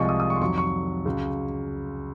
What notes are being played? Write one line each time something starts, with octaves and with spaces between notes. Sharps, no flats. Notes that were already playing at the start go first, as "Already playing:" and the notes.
Already playing: C2 C3 F3 G#3 D#5 C#6
D#6
D#6
C#6
C6
F2 D#3 F#3 C#6
C#6
C#2 C#3 F#3